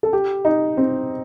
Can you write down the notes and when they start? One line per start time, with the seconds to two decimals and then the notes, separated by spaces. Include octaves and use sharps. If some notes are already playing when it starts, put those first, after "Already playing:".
0.03 A4
0.13 G4
0.45 D#4
0.77 C4